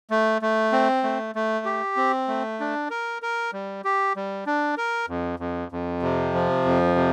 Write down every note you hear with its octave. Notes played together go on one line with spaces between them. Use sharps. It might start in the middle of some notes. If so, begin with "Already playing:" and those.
A3
A3
C4
A3
A3
G4
C4
A3
D4
A#4
A#4
G3
G4
G3
D4
A#4
F2
F2
F2
C3
F3
F2
C3